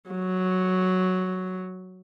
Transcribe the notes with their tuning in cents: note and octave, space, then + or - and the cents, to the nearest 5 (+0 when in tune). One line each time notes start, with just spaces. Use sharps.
F#3 +0